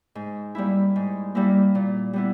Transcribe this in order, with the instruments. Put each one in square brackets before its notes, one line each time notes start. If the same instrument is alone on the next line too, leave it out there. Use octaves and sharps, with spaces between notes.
[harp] G#2
G3 A#3 E4
G#2
G3 A#3 E4
A#2
G3 B3 E4